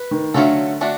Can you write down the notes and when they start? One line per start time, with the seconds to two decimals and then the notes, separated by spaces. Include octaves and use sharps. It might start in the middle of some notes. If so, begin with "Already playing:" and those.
Already playing: B4
0.11 D#3
0.34 D3 F#3 A3 C#4 F4 A4
0.81 A3 D4 F#4